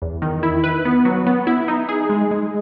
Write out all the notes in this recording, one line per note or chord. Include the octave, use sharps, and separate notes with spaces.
E2
D#3
E4
B4
B3
F#3
B3
E4
D#4
G#4
G#3
G#3